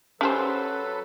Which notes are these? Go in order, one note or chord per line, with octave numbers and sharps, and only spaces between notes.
F#3 C#4 G4 A4 B4 C5